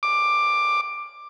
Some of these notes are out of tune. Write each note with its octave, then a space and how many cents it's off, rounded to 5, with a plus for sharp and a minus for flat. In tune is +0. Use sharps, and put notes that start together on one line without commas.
D6 +10